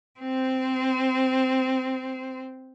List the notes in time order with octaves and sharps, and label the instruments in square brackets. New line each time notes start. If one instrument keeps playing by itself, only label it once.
[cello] C4 C5